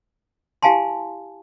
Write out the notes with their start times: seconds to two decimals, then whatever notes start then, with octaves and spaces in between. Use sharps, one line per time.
0.63 E4 G4 F5 G#5 A5 C6